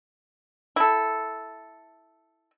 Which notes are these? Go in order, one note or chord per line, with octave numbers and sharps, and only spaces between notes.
E4 A4